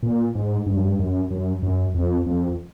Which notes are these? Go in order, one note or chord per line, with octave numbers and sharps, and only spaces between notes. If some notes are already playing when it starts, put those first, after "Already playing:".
A#2
G#2
G2
F#2
G2
F#2
F#2
F#2
F2
F2